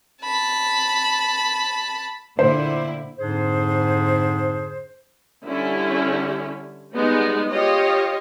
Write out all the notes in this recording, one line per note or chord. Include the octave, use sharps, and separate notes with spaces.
A5 B5
A#2 D3 E4 C5
F2 G#2 D3 D4 G#4 C5
D3 G3 C#4 E4
G3 G#3 B3 D#4
F4 G4 C#5 D#5